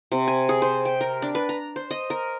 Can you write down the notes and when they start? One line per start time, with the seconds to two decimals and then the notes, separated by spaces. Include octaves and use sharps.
0.12 C3
0.28 G#5
0.49 G#4
0.62 C5
0.85 G5
1.01 A#4
1.22 D4
1.35 B4
1.49 A#5
1.76 C5
1.91 D#5
2.10 A#4